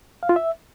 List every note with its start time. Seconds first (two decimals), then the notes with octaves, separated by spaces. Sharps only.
0.23 F5
0.29 F4
0.36 E5